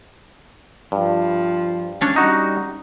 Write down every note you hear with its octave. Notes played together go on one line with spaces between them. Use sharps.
G2 F3
C#4 D4 C#5
G3 D#4 F#4